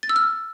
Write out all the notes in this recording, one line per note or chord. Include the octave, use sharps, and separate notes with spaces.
A6
E6
F6